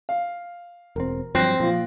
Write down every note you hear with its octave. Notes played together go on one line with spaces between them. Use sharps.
F5
E1 C4 A#4
G2 F3 F#3 C4 F#6 A#6
A#2 F3 F4